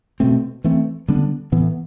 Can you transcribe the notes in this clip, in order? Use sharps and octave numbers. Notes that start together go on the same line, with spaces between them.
B2 A3 C4
E3 A3 C4
D3 G3 B3 D4
A2 E3 B3